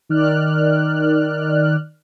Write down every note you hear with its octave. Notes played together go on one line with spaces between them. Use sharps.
D#3 D5 F6 F#6